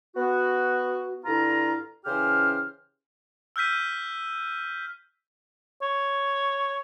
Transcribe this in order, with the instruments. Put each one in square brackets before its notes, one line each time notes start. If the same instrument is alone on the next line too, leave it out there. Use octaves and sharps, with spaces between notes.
[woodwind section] B3 F#4
G2 D3 E4 F4 A#5
C#3 E3 C#4 G4 C5 F6
[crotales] E6 F6 G6 B6 D#7
[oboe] C#5